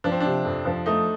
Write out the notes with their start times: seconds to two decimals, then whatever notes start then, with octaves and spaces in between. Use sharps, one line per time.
0.04 F3 D4
0.12 C4
0.20 C3 D4
0.45 F2
0.65 F3
0.86 A3 D#4